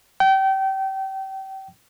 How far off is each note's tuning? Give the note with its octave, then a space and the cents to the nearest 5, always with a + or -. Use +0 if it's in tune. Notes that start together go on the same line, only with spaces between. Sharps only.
G5 -30